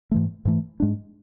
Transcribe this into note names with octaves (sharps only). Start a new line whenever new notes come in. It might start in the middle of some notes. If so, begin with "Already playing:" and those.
G#2 E3 A3
G#2 E3 A3
G#2 G#3 D4